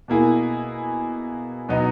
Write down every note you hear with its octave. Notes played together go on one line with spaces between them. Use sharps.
B2 A#3 E4 G#4
B2 F#3 B3 D#4